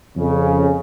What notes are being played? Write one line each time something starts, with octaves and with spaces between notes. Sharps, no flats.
F2 C#3